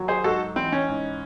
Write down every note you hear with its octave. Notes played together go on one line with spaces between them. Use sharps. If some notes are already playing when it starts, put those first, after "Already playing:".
Already playing: D#2 F#3
G#4 C5
G#2 F#4 A4
E3 C4
C#4
G#2